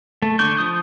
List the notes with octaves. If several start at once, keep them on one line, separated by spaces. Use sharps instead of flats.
A3
D3 D4 C#6 G6
F3 D#6 G6